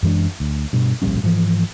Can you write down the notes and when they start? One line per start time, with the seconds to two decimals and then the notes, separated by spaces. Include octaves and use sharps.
0.03 F#2 E3 G#3 D4
0.40 D2
0.73 G2 B2
1.02 D1 A#1 G3 C#4
1.23 G#2 E3 F3